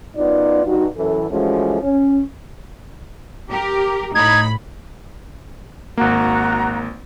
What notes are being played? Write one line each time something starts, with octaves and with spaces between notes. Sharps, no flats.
F#2 B3 D#4 F4 D5
G2 D#4 F#4
F#2 E3 A4
E3 F3 G#3 A3 C#4 F#4
C#4
G4 A#4
A2 D#4 B5 G#6
G#1 A#3 F#4 A#5